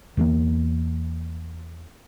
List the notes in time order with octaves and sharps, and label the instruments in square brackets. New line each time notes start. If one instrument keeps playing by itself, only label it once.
[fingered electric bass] E2 E3 A3 A#3